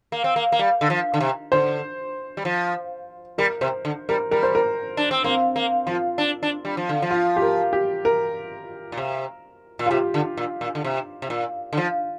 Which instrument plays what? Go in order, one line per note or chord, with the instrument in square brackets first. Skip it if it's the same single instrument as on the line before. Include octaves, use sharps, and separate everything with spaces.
[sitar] A#3
C4
A#3
A#3
G3
D3
F3
D3
C3
[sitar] D3 [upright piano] C5
[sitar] G3
F3
[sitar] G3 [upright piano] A#4
[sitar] C3 [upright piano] C5
[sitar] D3
[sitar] G3 [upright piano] A#4
[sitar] G3 [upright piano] A#4
[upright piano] C5
A#4
[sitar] D4
C4
[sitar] A#3 [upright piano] C4
[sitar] A#3
[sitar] F3 [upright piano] F4
[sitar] D4
D4
G3
F3
D3
F3
[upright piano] F4
G4
A#4
G4
A#4
[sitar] A#2
C3
A#2
[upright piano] F4
[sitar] C3 [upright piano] G4
[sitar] D3
A#2
A#2
D3
C3
C3
A#2
D3
F3